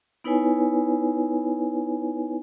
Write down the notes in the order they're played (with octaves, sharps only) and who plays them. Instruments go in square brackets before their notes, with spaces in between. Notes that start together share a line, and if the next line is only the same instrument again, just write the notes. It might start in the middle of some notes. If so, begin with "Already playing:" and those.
[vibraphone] B3 D#4 E4 B4 C#5 G#5